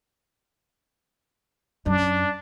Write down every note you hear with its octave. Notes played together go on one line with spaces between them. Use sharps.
F#2 D4